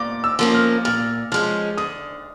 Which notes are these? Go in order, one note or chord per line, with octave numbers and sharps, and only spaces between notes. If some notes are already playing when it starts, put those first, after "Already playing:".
Already playing: A#2 D6
E6
F3 A#3 C#4
F6
A#2 F6
F3 G#3 C#4 F6
D3 D#6